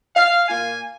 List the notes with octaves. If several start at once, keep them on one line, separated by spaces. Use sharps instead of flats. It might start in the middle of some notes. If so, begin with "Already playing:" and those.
F5
A#2 A#3 F4 G#5